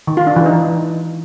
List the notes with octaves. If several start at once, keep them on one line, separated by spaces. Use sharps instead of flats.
D#3
F4
D4
E3
D#4